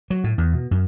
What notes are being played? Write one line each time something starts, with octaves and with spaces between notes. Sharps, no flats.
F#3
A2
E2
B2
F#2